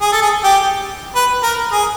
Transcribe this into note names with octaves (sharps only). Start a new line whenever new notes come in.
G#4
A4
G#4
G4
B4
A#4
G#4